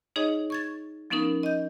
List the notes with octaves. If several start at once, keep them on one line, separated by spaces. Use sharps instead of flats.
D#4 G#4 C#5 D#5
C#6 G#6 A6
F3 B3 C#4 D#4 A#4
D#5 G6